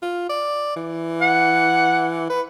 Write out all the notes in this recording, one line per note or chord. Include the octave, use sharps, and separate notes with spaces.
F4
D5
E3
F#5
B4